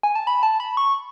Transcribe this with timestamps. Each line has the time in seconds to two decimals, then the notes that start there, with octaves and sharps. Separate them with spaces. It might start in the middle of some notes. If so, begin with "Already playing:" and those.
0.03 G#5
0.15 A5
0.27 B5
0.43 A5
0.60 B5
0.77 C#6